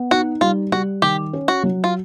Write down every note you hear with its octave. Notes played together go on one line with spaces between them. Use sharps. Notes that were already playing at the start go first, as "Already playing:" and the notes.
Already playing: B3
D#4 F#4
G3 F4
G3 F#4
D#3 G4
C#4
F#4
F#3
F4